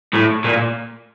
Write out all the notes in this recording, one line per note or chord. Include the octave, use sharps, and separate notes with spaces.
A2
A#2